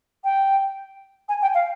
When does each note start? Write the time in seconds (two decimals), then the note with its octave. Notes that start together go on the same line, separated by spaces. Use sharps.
0.24 G5
1.29 G#5
1.42 G5
1.54 F5